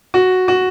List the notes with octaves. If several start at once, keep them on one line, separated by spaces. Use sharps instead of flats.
F#4
F#4